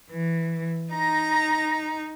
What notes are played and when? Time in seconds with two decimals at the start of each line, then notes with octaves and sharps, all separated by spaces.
0.11 E3
0.93 D#4 A#5